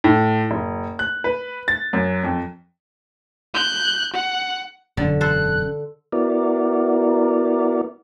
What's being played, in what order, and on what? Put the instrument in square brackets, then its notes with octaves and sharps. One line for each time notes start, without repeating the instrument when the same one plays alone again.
[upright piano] A2
F#1
F#6
B4
A6
F#2
F2
[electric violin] F#6 G6
F#5
[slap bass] E1 F#2 C#4 [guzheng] D3
[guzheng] A4 C5 [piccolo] F#6
[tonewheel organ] B3 E4 F#4 A#4 D5